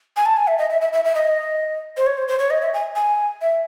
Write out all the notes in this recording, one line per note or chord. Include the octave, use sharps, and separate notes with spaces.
G#5
A5
G#5
E5
D#5
E5
E5
E5
E5
D#5
C5
C#5
C5
C5
C#5
D#5
E5
G#5
G#5
E5